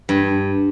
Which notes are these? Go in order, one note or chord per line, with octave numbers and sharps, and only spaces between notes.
G2